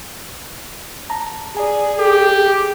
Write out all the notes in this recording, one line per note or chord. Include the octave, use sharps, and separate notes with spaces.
A5 A#5
G#4 D5 G#5
G4 A4